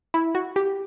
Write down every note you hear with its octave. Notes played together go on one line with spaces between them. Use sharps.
E4
F#4
G4